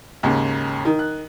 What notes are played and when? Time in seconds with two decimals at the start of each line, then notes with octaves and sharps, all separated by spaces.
0.23 D#2 G#2 C#3
0.85 D#3
0.99 F#6